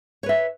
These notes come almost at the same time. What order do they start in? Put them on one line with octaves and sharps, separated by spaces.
C#5 B4 E5